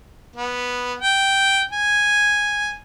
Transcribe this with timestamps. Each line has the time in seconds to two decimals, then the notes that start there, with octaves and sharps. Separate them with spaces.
0.36 B3
1.00 G5
1.72 G#5